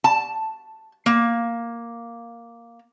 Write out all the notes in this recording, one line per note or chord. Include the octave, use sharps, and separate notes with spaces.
A5
A#3